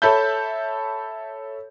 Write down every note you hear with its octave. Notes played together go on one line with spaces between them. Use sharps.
A4 C#5 E5 A5 B5 G6